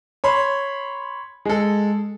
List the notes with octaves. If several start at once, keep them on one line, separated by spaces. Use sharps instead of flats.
C#5 B5 C6
G#3 A4